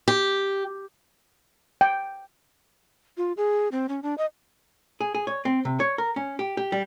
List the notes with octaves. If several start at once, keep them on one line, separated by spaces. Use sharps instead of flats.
G4
G5
F4
G#4
C4
C#4
D4
D#5
G#4
G#4
C#5
C4
C3
C#5
A#4
C#4
G4
G4
G3